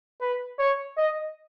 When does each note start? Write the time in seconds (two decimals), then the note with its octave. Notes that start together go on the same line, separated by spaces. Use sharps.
0.21 B4
0.59 C#5
0.97 D#5